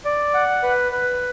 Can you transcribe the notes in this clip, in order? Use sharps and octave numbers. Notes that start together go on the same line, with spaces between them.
D5
F#5
B4
B4